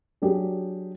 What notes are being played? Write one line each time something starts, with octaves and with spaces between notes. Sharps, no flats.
F#3 D4 G4 G#4